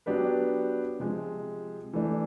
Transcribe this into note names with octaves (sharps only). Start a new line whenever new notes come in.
F#3 B3 D4 G4 B4
C3 F3 G#3
E3 A3 D4